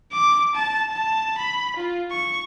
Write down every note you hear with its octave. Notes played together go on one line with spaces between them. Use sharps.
D6
A5
A5
B5
F4
C#6